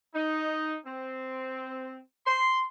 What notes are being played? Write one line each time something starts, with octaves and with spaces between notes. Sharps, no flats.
D#4
C4
C6